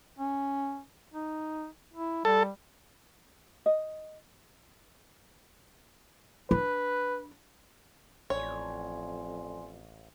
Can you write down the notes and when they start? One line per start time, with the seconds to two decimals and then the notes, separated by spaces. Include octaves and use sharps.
0.19 C#4
1.14 D#4
1.93 E4
2.25 G3 A4
3.66 D#5
6.51 D4 B4
8.30 A1 F2 C#5 D5 G#5 C6